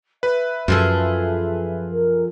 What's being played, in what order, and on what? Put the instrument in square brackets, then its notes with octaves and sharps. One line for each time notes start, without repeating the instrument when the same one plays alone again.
[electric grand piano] B4 [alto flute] E5
[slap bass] F#2 [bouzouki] F3 G#4 A4
[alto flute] A#4